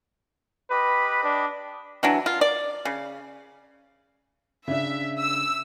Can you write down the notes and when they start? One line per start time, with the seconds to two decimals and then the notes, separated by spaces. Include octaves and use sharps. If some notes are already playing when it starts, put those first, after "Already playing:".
0.71 G4 B4 D#5 B5
1.24 D4
2.03 E3 F#3 D4
2.26 F4
2.41 D5
2.85 C#3
4.68 C#3 D4 E5
5.19 E6